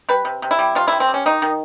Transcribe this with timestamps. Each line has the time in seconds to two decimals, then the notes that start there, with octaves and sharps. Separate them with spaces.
0.09 G3 B4
0.25 C3
0.42 C3
0.51 E4
0.59 G3
0.75 C3 F4
0.88 C3 E4
1.00 C4
1.08 G3
1.14 C#4
1.26 D#3 D#4
1.42 D#3